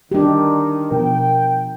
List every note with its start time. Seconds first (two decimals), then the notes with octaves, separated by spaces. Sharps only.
0.12 D#3 D4 G4
0.91 B2 F3 A#4 G5